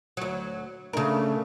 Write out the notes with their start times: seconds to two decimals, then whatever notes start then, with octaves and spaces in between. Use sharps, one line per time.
0.17 D2 F#3
0.93 C#3 A3 D4 A#4